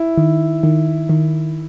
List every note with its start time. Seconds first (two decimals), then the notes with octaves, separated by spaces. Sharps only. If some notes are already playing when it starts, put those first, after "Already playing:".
Already playing: E4
0.17 D#3
0.63 D#3
1.09 D#3